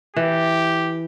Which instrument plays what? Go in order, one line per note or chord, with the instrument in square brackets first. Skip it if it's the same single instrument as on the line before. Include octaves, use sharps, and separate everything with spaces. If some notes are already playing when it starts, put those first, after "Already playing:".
[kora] E3 [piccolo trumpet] G4